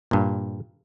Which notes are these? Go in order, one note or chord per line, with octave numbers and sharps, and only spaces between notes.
G2 A#2